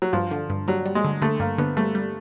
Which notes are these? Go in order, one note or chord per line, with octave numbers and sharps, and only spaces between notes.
F#3
G2 F3
D3
G2
F#3 G3
G3
G#3
D3
D3 A3
G2 A#3
D3 B3
G3 A3
G3